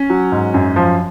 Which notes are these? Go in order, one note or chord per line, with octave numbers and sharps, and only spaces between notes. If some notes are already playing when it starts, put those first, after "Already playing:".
Already playing: C#4
F#3
G#2
F#2
F3